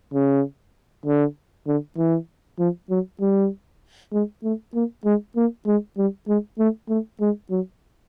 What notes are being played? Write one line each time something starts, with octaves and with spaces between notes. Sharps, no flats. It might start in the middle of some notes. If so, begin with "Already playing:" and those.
C#3
D3
D3
E3
F3
F#3
G3
G#3
A3
A#3
G#3
A#3
G#3
G3
G#3
A3
A3
G#3
F#3